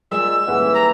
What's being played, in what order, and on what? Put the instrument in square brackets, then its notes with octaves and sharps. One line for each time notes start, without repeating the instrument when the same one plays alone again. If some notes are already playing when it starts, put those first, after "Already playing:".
[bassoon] A#2 [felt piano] G#3 [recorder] E6
[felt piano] D#1 G#4 F#5 [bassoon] E3
[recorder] A#5